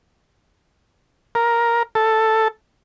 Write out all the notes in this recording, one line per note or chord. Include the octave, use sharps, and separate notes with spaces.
A#4
A4